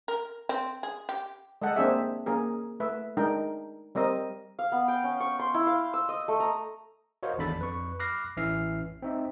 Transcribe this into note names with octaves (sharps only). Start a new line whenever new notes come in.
A#4
C4
G#4
G4
G#3 A4 D#5 F#5 G5 A5
A#3 C4 D4 G#4 E5
A#3 C#4 G#4 A#4
A3 B4 E5
G#3 D4 D#4 A#4 G5
G3 C4 A#4 D#5
F5
B3
G5
C#4
C#6
C6
E4
F5
E6
D#5
A3
A#5
F#4 A#4 C5 C#5 D#5 F5
G#1 E2 D4 A4 B5 A6
F2 B4 C#6
B5 D6 F6 F#6 A#6 C7
A1 E3 C#4 E5 F6 C7
C4 D#4 E5